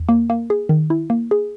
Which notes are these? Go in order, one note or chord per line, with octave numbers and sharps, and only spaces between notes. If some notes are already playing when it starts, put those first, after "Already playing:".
Already playing: E2
A#3
A#3
G#4
D#3
E4
A#3
G#4